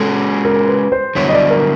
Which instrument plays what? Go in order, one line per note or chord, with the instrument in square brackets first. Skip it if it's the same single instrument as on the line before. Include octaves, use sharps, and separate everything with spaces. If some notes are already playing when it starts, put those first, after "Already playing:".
Already playing: [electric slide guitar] G#3 C#4 F#4 [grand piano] A4
[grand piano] A#4
B4
C5
[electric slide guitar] G2 D3 F#3 B3 E4 [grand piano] C#5
[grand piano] D#5
D5
A#4